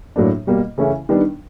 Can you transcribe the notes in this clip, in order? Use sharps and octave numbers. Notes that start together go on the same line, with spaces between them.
A2 F#3 A#3 D4
B2 G3 A#3
C#3 E3 A3 C#4 E4
D#3 G3 B3 D4